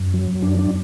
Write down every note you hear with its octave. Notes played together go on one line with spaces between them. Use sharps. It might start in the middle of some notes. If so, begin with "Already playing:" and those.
Already playing: F#2
F#3
F#2 D4
D4